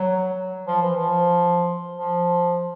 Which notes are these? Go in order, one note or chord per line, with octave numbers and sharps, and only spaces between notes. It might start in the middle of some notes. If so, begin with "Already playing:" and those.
Already playing: F#3
F3
E3
F3
F3